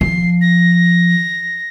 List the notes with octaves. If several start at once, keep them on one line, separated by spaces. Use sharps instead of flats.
F3 C7
A#6